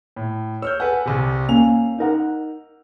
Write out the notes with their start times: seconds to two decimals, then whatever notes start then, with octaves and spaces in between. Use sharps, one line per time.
0.16 A2
0.62 C#5 E6 F6 G6
0.80 A4 B4 F#5 G#5
1.06 C2 C3
1.49 A#3 C#4 G#5 F7
1.99 D#4 A#4 F#5